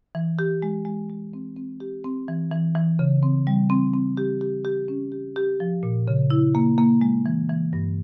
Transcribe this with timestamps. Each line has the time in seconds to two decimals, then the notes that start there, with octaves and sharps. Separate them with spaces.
0.15 E3
0.39 G4
0.62 G#3
0.85 G#3
1.10 G#3
1.33 C4
1.57 C4
1.80 G4
2.04 C4
2.28 E3
2.51 E3
2.75 E3
2.99 C#3
3.23 C4
3.47 G3
3.70 C4
3.94 C4
4.17 G4
4.41 G4
4.65 G4
4.88 C#4
5.12 G4
5.36 G4
5.60 F3
5.83 A#2
6.08 C#3
6.30 E4
6.55 A#3
6.78 A#3
7.01 G#3
7.26 E3
7.49 E3
7.73 G2